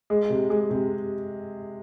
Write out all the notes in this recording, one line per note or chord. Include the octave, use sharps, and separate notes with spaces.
G#3
C3
G#3
C3